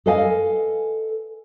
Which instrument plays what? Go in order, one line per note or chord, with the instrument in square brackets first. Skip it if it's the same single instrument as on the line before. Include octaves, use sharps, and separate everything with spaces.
[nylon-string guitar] A4 B4 D#5 F5 G#5